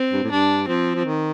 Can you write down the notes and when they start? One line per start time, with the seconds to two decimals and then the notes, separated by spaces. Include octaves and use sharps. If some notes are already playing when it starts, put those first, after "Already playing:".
Already playing: C4
0.12 G2
0.23 A2
0.31 G2 D4
0.67 F3 C4
0.95 F3
1.04 D#3